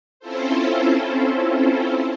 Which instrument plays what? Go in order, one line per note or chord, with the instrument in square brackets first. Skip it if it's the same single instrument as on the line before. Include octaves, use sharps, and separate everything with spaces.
[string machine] C4 C#4 E4 F4 A4 C5